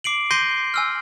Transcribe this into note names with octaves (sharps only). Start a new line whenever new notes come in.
D6 C7 D7 F#7
C6 G6 A#6 C7 D#7 G7
G#5 E6 F6